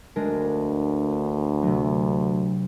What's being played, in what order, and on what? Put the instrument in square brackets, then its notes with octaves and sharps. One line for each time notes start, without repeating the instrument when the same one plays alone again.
[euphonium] D2 [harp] G#3 D4 A#4
[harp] C3 F#3